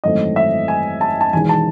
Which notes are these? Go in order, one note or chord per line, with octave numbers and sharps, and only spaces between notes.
G#1 F#2 E3 A3 C4 D#5
E5
G#5
A5
A5
E1 E2 D#3 G#5
A5